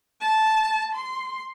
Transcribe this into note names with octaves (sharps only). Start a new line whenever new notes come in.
A5
C6